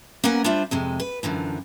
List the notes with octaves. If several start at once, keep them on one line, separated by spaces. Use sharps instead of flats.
A#3 B3 C#4 A#4 F#5 G#5
G3 D4 F4 C5 E5
F2 C3 G#3
B4
F#2 D3 E3 F3